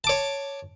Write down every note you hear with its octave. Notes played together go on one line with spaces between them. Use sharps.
C#5 A5 D6